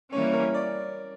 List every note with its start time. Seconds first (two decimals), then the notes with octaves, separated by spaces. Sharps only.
0.12 E3 G3 A#3 C#4 C#5
0.33 A#4
0.54 D5